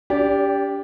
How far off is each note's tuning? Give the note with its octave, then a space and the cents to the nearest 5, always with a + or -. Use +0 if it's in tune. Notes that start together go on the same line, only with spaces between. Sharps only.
D4 -45 G4 +5 D5 -20